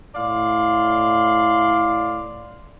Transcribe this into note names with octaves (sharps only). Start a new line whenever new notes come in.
A2 D5 F5 C6